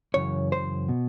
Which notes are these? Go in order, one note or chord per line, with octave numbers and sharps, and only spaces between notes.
F#2 C#3 E3 C#5
C5
B2